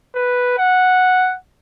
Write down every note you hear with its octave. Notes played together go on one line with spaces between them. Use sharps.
B4
F#5